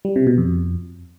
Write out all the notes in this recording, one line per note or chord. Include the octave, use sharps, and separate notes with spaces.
G3
C3
B2
F2